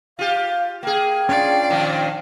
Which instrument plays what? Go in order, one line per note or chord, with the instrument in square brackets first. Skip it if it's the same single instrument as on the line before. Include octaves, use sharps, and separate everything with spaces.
[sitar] F4 G4 [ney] F5
[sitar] A#3 G#4 [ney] G5
[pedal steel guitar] C#4 D4 F4 [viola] D5
[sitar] A#2 D#3 F3